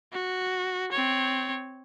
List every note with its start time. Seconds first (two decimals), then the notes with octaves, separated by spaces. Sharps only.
0.13 F#4
0.92 C4 C#5